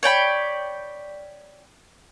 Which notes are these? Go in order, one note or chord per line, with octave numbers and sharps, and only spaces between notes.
C#5 D5 G5 B5